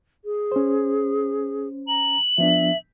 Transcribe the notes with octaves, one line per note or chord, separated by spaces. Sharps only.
G#4
C#4 C5
A#5 F#7
F3 B3 D4 E5